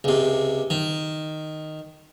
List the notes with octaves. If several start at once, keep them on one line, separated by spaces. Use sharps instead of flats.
C#2 C3
D#3